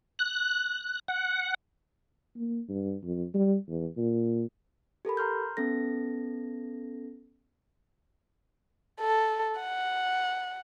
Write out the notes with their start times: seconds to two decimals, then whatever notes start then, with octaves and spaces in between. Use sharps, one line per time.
0.19 F#6
1.08 F#5
2.36 A#3
2.68 G2
3.03 F2
3.34 G3
3.68 E2
3.97 A#2
5.05 G4 A4 A#4 B5
5.17 A#5 C6 F6 G6
5.57 B3 C#4 A4 A#6
9.01 A4
9.61 F#5